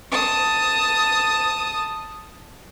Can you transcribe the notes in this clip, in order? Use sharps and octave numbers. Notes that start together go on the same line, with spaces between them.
A5 D#6